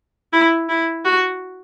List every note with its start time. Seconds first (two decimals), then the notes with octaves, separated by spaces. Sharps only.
0.33 E4
0.69 E4
1.05 F#4